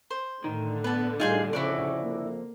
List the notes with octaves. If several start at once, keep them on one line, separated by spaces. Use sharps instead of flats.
C5
A2 D3 D#3
B3 B4 A5
A2 G3 D#4 F4 G#4 C5
F2 C#3 C#4 E4 F#4 D5
A#3